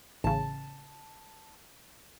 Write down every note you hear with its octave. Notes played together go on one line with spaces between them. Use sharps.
A1 C#3 A5